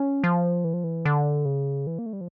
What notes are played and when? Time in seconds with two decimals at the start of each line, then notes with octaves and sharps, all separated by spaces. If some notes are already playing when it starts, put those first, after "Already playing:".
Already playing: C#4
0.24 F3
0.64 E3
0.74 F3
0.84 E3
1.05 D3
1.45 C#3
1.87 E3
1.99 A#3
2.06 A3
2.13 G3
2.21 F3